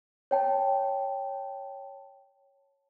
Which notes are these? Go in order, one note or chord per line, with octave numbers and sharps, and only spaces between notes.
C#5 G5 A5